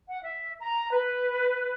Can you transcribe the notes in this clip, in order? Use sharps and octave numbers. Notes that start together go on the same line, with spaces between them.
F#5
E5
A#5
B4